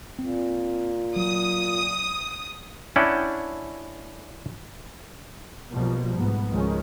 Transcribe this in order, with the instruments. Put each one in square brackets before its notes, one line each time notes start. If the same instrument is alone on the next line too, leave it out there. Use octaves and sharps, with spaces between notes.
[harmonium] A#2 [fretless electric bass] C4
[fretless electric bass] F#3 [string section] D#6
[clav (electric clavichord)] C#4 D4 E4 F#5 G5
[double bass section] B1 B2 F3 G3 A#3
B1 G#2 B3
C#2 D#3 F3 G#3 C#4